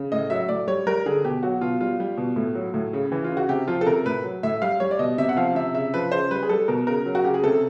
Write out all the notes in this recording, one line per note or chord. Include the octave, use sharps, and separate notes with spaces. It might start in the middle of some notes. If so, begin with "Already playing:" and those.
Already playing: C#3
A2 D#5
F#3 E5
A2 D5
G3 C#5
G3 A#4
D3 G#4
B2 G4
F#3 F#4
B2 F4
G3 F4
G3
B2
A2
F#3
A2
C#3
E3
F4
C#3
F#4
C3 G4
F3 F4
A4
C3 A#4
A2 B4
F#3
A2 E5
G3 F5
G3 C#5
D5
B2 D#5
C3 E5
F#5
F3 F5
C3 E5
C#3 E5
F3 B4
C#3 C5
G3 B4
G#4
G3 A4
B2 A#4
C#3 A#4
F#3
F#4
C#3 G4
G#4
C3 A4